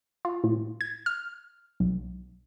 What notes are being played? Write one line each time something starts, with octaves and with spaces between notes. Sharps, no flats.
F4
A2
G#6
F6
B1